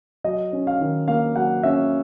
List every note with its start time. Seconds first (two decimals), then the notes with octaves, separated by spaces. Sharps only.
0.24 F#3 D#5
0.53 C#4
0.67 F5
0.81 D#3
1.08 A#3 F5
1.36 F#3 F#5
1.63 C#4 E5